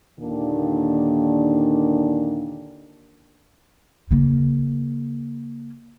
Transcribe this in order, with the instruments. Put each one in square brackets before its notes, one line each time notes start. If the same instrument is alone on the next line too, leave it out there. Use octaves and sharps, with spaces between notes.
[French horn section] D#2 A#2 D3 D#3 D4
[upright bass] C#3 A#3